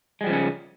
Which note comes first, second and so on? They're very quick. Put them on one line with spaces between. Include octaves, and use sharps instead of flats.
G#3 G3 F3 C#3 C#4